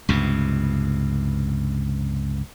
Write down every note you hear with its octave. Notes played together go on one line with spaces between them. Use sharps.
C#2 G2 C3